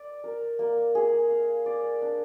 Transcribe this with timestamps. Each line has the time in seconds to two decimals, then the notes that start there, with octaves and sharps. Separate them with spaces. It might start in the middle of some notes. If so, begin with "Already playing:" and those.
Already playing: D5
0.24 A#4
0.59 A#3
0.95 G#4
1.30 F5
1.66 D5
2.02 D4